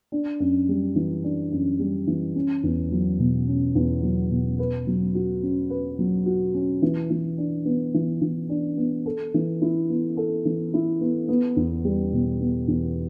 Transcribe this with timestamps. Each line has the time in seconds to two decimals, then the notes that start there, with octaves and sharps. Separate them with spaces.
0.12 D4
0.40 F#2
0.69 G3
0.96 E3
1.24 D4
1.52 F#2
1.79 G3
2.07 E3
2.35 C#4
2.63 E2
2.92 F#3
3.20 B2
3.47 C#4
3.75 E2
4.03 F#3
4.31 B2
4.59 B4
4.87 F#3
5.15 F#4
5.43 C#4
5.70 B4
5.99 F#3
6.26 F#4
6.54 C#4
6.82 E3
7.10 E3
7.38 D4
7.65 B3
7.94 E3
8.21 E3
8.50 D4
8.77 B3
9.06 A4
9.34 E3
9.62 E4
9.90 B3
10.17 A4
10.45 E3
10.74 E4
11.01 B3
11.28 B3
11.57 E2
11.84 G3
12.13 B2
12.40 B3
12.68 E2